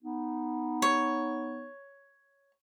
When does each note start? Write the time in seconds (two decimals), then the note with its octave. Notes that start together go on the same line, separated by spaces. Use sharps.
0.03 B3 D#4
0.82 C#5